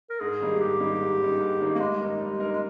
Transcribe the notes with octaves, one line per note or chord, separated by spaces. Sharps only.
A#4
G#2 G#4
D#3 G3 A#3 D#4
G#2 G4
D#3 G3 A#3 D#4
G#2
D#3 G3 A#3 D#4
G#2
D#3 G3 A#3 D#4
A#3
G3 G#3
A#3 D#4 A#4
G3
A#3 D#4 A#4
G#3